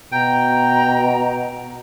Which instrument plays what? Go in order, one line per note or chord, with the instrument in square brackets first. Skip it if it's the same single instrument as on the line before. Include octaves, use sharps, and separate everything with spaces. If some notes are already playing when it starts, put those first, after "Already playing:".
[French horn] B2 [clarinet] G5 [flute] A#5